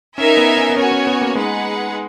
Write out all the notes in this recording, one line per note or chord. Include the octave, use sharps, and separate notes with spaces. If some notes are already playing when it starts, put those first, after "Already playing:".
C#4 D#4 A#4 E5 G#5
B3
C#4
B3
C#4 F#4 C#5 G#5
C#4
B3
A#3
G#3 D#4 G#4 B4 F#5